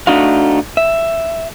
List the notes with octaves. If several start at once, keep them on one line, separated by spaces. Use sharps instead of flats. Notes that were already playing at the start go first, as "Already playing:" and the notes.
A3 D4 D#4 F#4 F5
E5